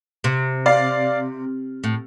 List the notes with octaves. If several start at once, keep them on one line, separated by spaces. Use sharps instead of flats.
C3
D5 F5
A2